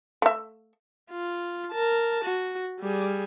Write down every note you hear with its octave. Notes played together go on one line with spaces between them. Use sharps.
A3 E5
F4
A#4 A5
F#4
G3 G#4